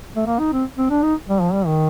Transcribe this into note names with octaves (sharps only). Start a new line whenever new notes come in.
A3
A#3
D#4
C4
C4
D4
D#4
G3
F3
G3
D#3